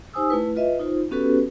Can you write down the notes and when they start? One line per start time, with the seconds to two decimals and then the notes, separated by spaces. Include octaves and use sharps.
0.14 D#4 G4 C5 G#5 D#6 E6
0.30 A3 E4 B4
0.56 F4 B4 D#5 E5
0.80 D#4 F4 C5
1.11 B3 C#4 F#4 G4 A4 B4